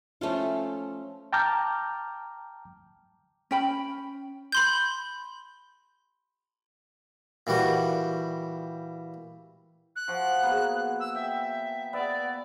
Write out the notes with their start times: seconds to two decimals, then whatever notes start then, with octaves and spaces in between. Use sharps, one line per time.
0.21 F3 A3 C#4 F4
1.33 G5 A5 A#5 D6 F6 G6
3.51 C#4 G5 B5
4.52 B5 C6 G6
7.47 A#2 E3 G3 F#4
9.96 F#6
10.08 F3 F#4
10.43 A#3 B3 G#4
11.00 E6
11.15 E5 G5
11.93 B3 D5 E5